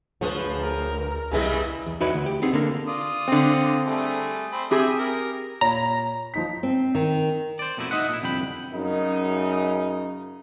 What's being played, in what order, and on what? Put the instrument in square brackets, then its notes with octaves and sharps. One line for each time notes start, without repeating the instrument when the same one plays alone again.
[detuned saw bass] D2 [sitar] F3 G#4 [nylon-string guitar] B4 C#5
[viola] A#4
[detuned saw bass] C2 [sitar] C#3 G3 G#3 [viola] E4 [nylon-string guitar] G#4 B4 D#5
[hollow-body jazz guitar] E2
D#4 E4 F#4 B4 C#5 D5
D2
G4
B3 C4 D#4 G#4
D3 A#3 A#4
[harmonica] F4 D5 D#6
[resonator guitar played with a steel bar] D3 C4
[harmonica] G3 A3 G#4
C4 B5
[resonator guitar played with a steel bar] C4 G4 G#4 [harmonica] E5 B5 D#6
[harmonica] A#4
[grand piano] A#2 C#5 B5 [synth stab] A#5
[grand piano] F3 D#4 B6
[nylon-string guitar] C4
D#3
[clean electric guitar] C5 D5
F2 B2 A3 D#4 E4
D#4 D#5 E5 F#5
A#2 E4
C2 F2 D3 G5 B5
[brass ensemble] F#2 C#3 D#4